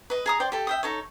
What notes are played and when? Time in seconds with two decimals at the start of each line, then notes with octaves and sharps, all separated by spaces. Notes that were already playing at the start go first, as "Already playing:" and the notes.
0.10 B4 D#5
0.26 G#4 A#5 D#6
0.40 C5 D5 G5
0.52 G4 A4
0.67 E5 G5 D#6
0.83 D#4 A4 C#5